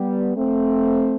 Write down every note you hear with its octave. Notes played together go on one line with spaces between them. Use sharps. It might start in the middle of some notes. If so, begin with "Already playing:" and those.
Already playing: G3 B3
A3 C4